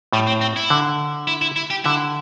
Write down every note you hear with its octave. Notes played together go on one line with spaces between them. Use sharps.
A2 G3
C4
C4
E4
D3
E4
E4
E4
G4
D3 E4